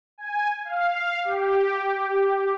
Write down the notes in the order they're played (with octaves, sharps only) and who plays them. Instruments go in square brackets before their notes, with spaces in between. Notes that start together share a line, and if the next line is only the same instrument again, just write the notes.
[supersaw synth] G#5
F5
G4